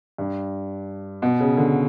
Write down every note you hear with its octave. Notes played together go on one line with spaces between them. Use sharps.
G2
B2
C#3
D3